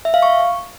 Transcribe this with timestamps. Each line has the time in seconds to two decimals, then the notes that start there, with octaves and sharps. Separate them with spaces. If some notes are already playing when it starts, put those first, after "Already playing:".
0.05 E5
0.14 F5
0.23 C#6